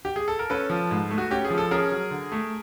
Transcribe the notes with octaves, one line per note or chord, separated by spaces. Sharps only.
G4
G#4
A4
A#4
C#4 A4 B4
F3
G#2
A3
F#4
C#4 G4
G#4
F3
A4
C#4 G#4 A#4
F#3
D3
A3